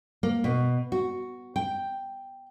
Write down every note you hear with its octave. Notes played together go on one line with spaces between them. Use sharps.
A#3
B2
F#4
G5